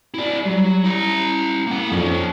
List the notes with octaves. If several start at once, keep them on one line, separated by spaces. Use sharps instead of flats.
E4 D5
F#3 G3
E4 A#5
A#3 F#5
F2 C#4 D#4